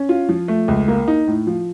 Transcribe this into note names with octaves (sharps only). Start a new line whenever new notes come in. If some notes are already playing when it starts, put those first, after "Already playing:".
Already playing: C#4
F4
F3
A3
C#2
A#3
D#4
A2
F3